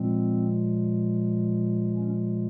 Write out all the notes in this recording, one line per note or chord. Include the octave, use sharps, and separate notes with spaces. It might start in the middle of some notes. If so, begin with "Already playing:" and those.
Already playing: A#2 F3 G#3 C4
C#4